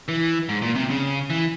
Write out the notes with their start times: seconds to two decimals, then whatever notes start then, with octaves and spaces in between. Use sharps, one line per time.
0.08 E3
0.49 G#2
0.62 A#2
0.75 C3
0.90 C#3
1.30 E3